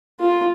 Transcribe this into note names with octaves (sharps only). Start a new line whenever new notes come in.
F4